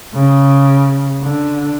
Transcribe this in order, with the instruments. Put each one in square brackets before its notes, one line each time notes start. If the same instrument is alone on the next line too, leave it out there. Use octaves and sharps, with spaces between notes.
[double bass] C#3
D3